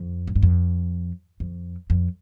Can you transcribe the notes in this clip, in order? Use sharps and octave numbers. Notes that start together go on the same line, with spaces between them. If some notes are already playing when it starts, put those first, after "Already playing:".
Already playing: F2
G#2
G2
F2
F2
F2